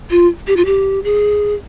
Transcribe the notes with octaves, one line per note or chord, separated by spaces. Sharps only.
F4
G4
F4
G4
G#4